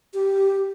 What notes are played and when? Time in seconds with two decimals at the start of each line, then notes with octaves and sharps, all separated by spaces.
0.14 G4